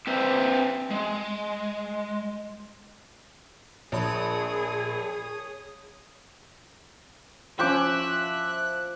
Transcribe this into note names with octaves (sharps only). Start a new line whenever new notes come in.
C4 B4 C5 E5
G#3
A#1 G#4 A#4 C#5 A5 B5 D#6
F3 C#4 E5 G5 D6 F#6